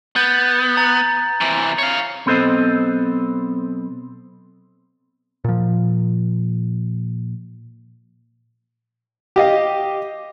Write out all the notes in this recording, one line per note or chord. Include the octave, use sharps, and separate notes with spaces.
B3 G6 A6
A#5 A6
C3 E3
C#5 F5
B1 B3 C4 A4 C5 D#5
A#2 F3
G4 D#5 F5